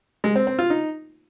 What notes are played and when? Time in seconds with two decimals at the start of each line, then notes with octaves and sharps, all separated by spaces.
0.24 G#3
0.35 C4
0.47 C4
0.59 F4
0.70 D#4